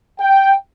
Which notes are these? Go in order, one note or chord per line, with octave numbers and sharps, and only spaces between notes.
G5